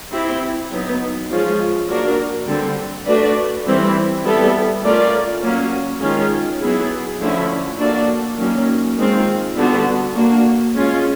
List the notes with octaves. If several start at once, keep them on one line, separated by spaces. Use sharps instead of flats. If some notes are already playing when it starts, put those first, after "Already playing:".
C4 E4 G4
F#3 B3 D#4
F3 G#3 C#4 F4
F#3 A#3 D4 F#4 A#4
D3 G3 C4
A3 D4 F#4 B4 D5
E3 G3 C4 E4
G3 B3 E4 A4
A3 C#4 F4 A#4 D5
F#3 A#3 C#4
D#3 G#3 C#4 F4
F#3 B3 E4 G#4
D3 F3 A3 C#4 E4
A#3 D4 F#4 A4 D5
D#3 F#3 A#3 C#4
D#3 G#3 C4 F4
D3 G3 B3 D4 F#4
A#3 D4 F#4
G#3 C#4 F4